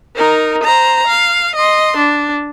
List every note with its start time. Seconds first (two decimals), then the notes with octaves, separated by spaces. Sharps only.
0.16 D#4 A#4
0.63 C5 A#5
1.07 F5
1.55 D#5 C6
1.97 D4